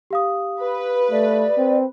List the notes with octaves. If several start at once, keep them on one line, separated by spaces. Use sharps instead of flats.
G4 F5 D#6
B4
A3 D5
C4